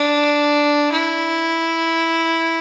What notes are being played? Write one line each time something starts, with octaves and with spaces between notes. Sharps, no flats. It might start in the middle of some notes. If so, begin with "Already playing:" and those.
Already playing: D4
E4